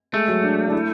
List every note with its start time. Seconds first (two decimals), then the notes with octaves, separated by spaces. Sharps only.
0.13 G#3 A3
0.28 F#3
0.43 D4
0.68 D4
0.72 E4